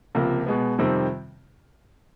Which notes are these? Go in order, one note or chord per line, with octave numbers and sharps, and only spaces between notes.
C#2 C3 F3 A#3
B2 G#3 B3
F2 C3 D#3 G3 C4